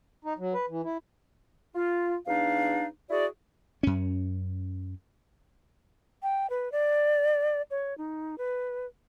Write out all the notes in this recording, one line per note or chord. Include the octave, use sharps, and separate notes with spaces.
D#4
F#3
B4
E3
E4
F4
E2 D4 D#4 F5
E4 F#4 G#4 D5
F#2 C#4
G5
B4
D5
C#5
D#4
B4